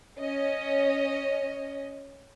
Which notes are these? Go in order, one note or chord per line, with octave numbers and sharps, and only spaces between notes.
C#4 D#5